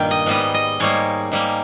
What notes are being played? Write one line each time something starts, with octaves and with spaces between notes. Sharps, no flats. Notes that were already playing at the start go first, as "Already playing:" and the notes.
Already playing: G2 A#2 D#3 G3 A#3 G5
D#5
G#2 G3 B3 D#5
D#5
G#2 G3 A#3 C#5
G#2 G3 A#3